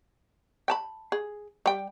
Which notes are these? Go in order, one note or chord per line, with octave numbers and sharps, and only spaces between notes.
G5 A5 B5
G#4
G3 G5